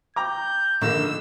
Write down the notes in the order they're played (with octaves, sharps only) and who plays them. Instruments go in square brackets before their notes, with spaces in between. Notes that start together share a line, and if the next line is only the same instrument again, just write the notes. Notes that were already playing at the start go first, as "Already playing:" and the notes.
[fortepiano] G5 A#5 D6 [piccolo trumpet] G6
[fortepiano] A#1 [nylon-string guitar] D3 D#3 A#3 [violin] E6